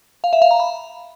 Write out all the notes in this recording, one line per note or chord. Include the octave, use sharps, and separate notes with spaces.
F5
E5
F5
A#5
B5